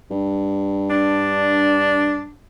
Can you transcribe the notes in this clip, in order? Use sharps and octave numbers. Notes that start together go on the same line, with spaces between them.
G2
D4